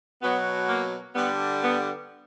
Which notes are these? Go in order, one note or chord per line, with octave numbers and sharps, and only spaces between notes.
B2 F#3 B3
A#3
D3 G3 B3
B3